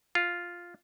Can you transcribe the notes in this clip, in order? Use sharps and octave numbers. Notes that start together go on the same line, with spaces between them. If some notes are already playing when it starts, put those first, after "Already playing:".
F4